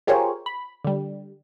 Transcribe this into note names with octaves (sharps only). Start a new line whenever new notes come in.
F4 G4 G#4 A#4 C5 C#5
B5
D3 G3